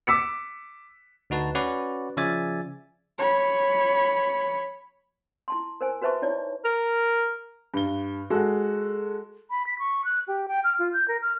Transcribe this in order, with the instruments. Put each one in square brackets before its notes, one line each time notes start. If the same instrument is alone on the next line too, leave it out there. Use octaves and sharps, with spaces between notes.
[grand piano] D6 E6 B6 C#7
[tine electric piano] D2 D#4 F#4 B4 A5
C#4 F#4 B4 D5
C#3 F3 D5 E5 G#5 A6
[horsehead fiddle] C#5 B5
[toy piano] E4 A5 C6
A#4 C5 G#5
F#4 B4 C5 E5 A5 C#6
D#4 E4 C#5 D5
[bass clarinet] A#4
[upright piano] G2 G7
G#3 F#4 A4
[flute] B5
B6
C#6
F#6
G4
G5
F6
F4
G6
A#4
F6